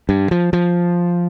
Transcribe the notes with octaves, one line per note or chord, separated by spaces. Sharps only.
G2
F3
F3